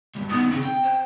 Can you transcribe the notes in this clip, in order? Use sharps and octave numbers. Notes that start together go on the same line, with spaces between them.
C#2 G2
B2 D#3 B3
C#3 C4 C#4
G5
C5